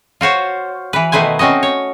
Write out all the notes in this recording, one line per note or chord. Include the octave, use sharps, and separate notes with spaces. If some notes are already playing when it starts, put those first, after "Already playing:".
F4 F#4 C5 C#5
E3 B4
B2 D#3 A3 B4 C5 G#5
C4 C#4 F#4 D#5
C#5